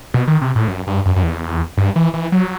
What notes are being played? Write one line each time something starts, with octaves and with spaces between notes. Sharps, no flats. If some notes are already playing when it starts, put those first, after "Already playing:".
B2
D#3
C3
A2
F#2
G2
F#2
F#2
E2
G2
E3
E3
F#3